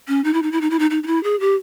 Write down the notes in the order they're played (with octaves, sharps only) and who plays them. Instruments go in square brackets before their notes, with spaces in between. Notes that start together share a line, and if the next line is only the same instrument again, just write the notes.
[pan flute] C#4
D#4
E4
D#4
E4
D#4
E4
D#4
D#4
D#4
E4
G#4
G4